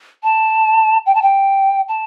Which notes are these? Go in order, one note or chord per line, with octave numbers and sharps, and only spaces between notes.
A5
G5
A5
G5
A5